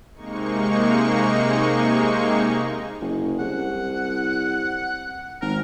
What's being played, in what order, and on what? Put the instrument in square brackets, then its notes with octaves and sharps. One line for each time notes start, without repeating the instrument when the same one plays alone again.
[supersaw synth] C3 G#3 A#3 D#4 C#6
[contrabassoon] F#1
[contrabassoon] C2 [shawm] F#5
[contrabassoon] G#1 [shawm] A#4